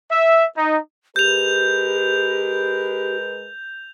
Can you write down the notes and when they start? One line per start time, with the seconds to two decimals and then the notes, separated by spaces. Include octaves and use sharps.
0.11 E5
0.56 D#4
1.16 G#3 G4 A#4 B4 G6 F7